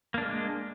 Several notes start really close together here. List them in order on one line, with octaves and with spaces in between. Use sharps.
A#3 D4 G#3